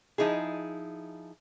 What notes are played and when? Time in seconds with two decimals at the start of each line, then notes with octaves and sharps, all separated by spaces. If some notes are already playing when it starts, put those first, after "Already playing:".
0.18 F3 D#4 E4 G#4